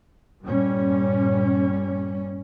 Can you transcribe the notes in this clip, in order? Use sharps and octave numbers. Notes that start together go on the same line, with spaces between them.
G2 A#2 G3 C#4